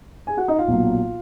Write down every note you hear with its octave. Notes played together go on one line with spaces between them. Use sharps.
G#4 G#5
F#4 F#5
D#4 D#5
F4 F5
B1 A#2 F#3 A#3